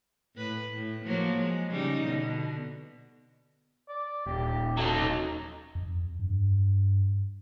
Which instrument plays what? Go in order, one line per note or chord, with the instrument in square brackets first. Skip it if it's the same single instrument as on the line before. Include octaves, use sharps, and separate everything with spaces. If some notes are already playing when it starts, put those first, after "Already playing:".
[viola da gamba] A2 B4
A2
F3 F#3 A#3
G#3
C#3 G3 D#4
B2 D3
[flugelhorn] D5
[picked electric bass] D#1 [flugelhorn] G4
[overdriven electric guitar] F#3 D#4 [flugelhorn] A4
[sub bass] F2
G2